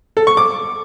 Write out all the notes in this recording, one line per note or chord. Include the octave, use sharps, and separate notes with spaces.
A4
C#6
D6